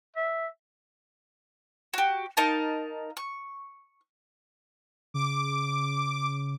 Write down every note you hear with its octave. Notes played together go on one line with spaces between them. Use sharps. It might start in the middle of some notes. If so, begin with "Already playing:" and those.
E5
F#4 G4
D#4 A#4 F5 A5
C#6
C#3 D6